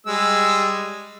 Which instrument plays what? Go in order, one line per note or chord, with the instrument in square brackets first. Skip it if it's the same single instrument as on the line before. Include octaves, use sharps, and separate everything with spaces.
[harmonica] G3 G#3 E6